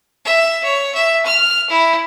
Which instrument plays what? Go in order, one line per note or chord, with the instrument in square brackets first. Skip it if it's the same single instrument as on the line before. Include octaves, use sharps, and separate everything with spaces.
[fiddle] E5
C#5
E5
F6
E4